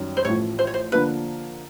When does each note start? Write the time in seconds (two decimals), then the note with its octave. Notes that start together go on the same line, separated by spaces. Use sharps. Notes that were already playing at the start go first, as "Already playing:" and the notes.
Already playing: F#2 D#3 G3 C#4
0.17 C5
0.25 A1 A2 F3 C#5
0.59 C5
0.67 C#5
0.74 C5
0.92 D3 F3 A#3 D4 B4